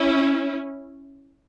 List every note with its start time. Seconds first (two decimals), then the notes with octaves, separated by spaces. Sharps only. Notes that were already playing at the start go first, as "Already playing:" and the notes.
Already playing: C#4 E4